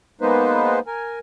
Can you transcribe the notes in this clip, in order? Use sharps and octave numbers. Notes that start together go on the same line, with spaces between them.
G#3 A#3 B3 D#4 B4 C5
A#4 G#5